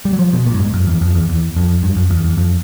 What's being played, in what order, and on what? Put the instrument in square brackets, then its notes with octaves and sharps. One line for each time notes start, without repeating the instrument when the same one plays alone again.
[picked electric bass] G3
F#3
F3
B2
A#2
G2
G#2
F#2
E2
F2
E2
E2
F2
G2
F#2
E2
E2
F2